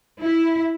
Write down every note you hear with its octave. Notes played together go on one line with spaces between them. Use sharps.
E4